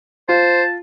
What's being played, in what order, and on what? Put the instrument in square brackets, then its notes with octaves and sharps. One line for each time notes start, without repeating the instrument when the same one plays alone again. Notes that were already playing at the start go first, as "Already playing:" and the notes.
[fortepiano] F4 [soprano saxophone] C5 [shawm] A5